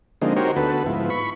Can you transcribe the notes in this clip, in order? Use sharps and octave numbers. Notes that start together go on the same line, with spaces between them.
D3 F3 G#3 A#3 C4 D#4
D#4 F#4 G4 A#4 C5 C#5
D2 B3 F#4 A4 B4
G#2 F3 B3 E4
B5 C#6